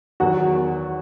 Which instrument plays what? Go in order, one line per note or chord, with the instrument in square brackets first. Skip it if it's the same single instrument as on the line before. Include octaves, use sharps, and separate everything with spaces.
[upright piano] E2 D#3 F#3 F#4